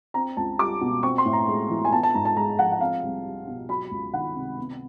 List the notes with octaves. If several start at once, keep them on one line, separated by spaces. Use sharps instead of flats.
C4 A#5
C#2 A5
G3 D6
B2
C4 C#6
C6
A2
A#5
G#3
E3
G#5
B3 A5
A5
G#2 A#5
A5
G#3 A#5
F3 F#5
F#5
C4 F5
C2
G3
B2
F#3 B5
C#2
D#3 F#5
C3
B3